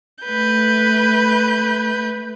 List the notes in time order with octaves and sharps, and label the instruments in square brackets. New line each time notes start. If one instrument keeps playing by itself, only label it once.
[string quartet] A3 B4 G6